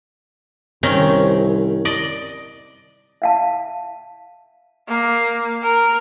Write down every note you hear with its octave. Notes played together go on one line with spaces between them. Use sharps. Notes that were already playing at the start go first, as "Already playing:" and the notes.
C2 D#3 C4 C#4
D5 D#5
E5 F5 A5
A#3
A#4